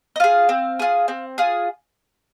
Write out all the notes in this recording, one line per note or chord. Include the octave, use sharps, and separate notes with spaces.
D#5
F4 G#4 F5
C4
F4 G#4
C4
F4 G#4